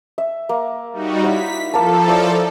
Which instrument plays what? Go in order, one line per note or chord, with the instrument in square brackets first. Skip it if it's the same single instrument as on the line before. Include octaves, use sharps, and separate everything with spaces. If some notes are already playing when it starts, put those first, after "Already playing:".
[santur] E5
A#3
[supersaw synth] G3 D#4 F#4
[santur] E4 C#5 [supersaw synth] B6
[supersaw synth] F3 A4 [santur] A#3 F5 A5
[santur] E4 C#5 D5